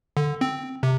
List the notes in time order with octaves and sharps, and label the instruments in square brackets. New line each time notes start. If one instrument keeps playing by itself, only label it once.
[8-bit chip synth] D3
C4
C3